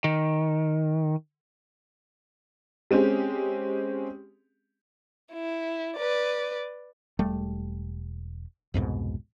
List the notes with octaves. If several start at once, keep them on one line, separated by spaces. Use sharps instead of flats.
D#3
G#3 C4 C#4 G4 G#4
E4
B4 D5
E1 G3 A3
C2 F2 G#2 B2